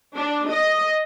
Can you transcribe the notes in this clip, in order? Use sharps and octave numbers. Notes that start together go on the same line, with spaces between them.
D4
D#5